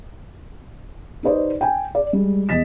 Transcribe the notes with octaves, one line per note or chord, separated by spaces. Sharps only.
D#4 G4 B4 C5 D5 D#5
G5 G#5
D5
G3 G#3
E2 D#5 A6 B6 E7